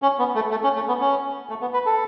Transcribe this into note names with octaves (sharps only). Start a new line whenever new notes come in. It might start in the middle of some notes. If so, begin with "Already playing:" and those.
C#4
B3
A3
A3
C#4
A3
B3
C#4
A3
B3
B4
A4